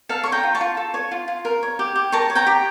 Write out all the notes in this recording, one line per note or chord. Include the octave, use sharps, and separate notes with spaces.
A4 F5 A5
C#5 C#6
G5 A#5
F4
A5 C#6
F4
A4
C#5
F4
F4
A#4
C#5
G4
G4
A#4 A5 C#6
C#5
G5 A#5
G4